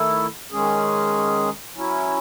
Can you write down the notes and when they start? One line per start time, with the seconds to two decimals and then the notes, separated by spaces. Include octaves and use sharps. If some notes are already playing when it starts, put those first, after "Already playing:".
Already playing: D#3 A3 E4 A4
0.51 D#3 G#3 C#4 G#4
1.74 F#3 C#4 E4